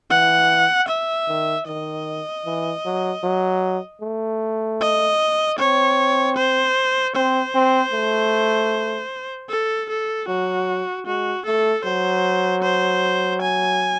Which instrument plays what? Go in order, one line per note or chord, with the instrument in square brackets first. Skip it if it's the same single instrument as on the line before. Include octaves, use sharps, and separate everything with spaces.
[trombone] E3 [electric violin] F#5
[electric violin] E5
[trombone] D#3
[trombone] D#3 [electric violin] D#5
[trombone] E3
F#3
F#3
A3
[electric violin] D#5
[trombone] C4 [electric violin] C#5
[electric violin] C5
[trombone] C4 [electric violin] C5
[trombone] C4
A3
[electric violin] A4
A4
[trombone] F#3 [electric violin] F#4
[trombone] G#3 [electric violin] F#4
[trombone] A3 [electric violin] A4
[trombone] F#3 [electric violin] C5
[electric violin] C5
G#5